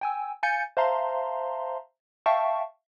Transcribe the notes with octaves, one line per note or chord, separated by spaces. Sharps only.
G5 G#5 E6
F5 G#5 G6 A6 C#7
C5 E5 F5 A5 A#5 C6
E5 F5 G5 A5 C#6